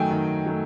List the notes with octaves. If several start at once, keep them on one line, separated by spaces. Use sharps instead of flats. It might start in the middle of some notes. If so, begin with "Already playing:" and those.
Already playing: D#3 F#3 A3 G5 G#5
D#3
F#3 A3